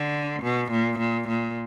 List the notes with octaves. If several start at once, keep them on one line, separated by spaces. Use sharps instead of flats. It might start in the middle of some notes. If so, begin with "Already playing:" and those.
Already playing: D3
B2
A#2
A#2
A#2